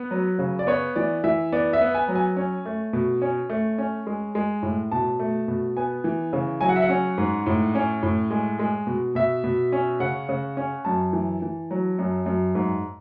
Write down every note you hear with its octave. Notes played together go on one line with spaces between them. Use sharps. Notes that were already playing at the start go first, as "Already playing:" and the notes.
Already playing: B3 B4
F#3
C#3
D5
B3 C#5
E3 D5
E3 E5
B3 D5
E5
B3
G#5
F#3
G#5
C#4
A3
B2
C#4
A3
C#4
G#3
G#3
A2
B2 A5
A3
B2
B3 G#5
E3
C#3
F#3 G#5
F#5
E5
F#5
C#4
G#2
A2
C#4
A2
G#3
G#3
B2
B2 E5
B2
C#4
C#3 F#5
C#3
C#4
F#2 A5
E3
E3
F#3
F#2
F#2
G#2